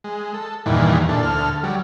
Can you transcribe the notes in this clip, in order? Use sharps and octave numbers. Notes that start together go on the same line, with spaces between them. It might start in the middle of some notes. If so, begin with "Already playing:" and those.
G#3
A4
E2 G2 A#2 D#3 E3
A#2 D4 A4
D2 A4 F6
F#3 G3